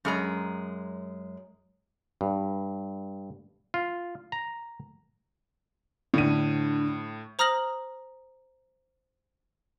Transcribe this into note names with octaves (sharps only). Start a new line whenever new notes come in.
F#2 G#3 A#5
G2
F4
A#5
A2 D3 D#7
C5 A#5 D#6 F6 A#6 F#7